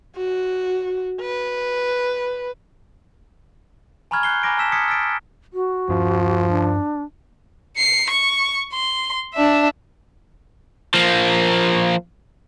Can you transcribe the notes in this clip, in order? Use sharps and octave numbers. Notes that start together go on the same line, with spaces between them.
F#4
B4
G#5 A#5 B5 C#6 F6 G#6
F#6 G6 C7 C#7 G7
G#5 A#5 B5 D6 A#6 D7
A5 B5 E6 B6 E7
D#6 F6 G#6 B6 C#7
E6 F6 A6 B6 D7
F#4
G2 F3 C#4
D4
C7 C#7
C#6
C6
D4 E5
F3 A#3